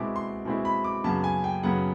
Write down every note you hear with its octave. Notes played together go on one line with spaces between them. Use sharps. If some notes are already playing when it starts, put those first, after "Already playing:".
Already playing: B2 G#3 C4 E4 D6
C6
B2 G#3 C4 E4
B5
D6
F#2 C#3 F#3 B3 A5
G#5
G5
F#2 C#3 F#3 B3 F#5